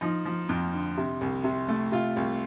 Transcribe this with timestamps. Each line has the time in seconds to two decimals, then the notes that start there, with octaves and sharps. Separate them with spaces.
0.01 F3 D#4
0.25 F3
0.49 F2
0.73 D3
0.97 C3
1.21 C2
1.44 C3
1.68 A3
1.92 C3 F4
2.16 C2